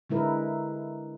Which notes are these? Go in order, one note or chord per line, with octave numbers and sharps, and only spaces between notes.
D3 G#3 E4 A#4 B4